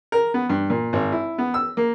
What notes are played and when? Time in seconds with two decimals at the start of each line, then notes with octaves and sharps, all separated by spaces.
0.12 A#4
0.34 B3
0.49 G2
0.70 A#2
0.93 G#1
1.12 E4
1.38 B3
1.54 E6
1.77 A#3